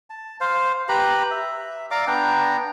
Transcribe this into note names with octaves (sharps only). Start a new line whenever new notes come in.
A5
C5 F5
G4 B4 A#5 B5
E5
D5 F5 A#5 D6
B3 D4 G5 A#5